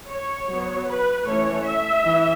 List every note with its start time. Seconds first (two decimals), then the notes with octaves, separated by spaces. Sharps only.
0.09 C#5
0.49 F#3 B3
0.88 B4
1.27 E3 A3 C#4 C#5
1.66 E5
2.04 E3